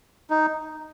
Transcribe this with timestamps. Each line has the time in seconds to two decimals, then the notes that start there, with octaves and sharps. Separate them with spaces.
0.30 D#4